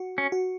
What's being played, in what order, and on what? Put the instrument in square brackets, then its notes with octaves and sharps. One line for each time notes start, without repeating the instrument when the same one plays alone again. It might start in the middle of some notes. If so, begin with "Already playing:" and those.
Already playing: [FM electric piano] F#4
[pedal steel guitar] C#4
[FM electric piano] F#4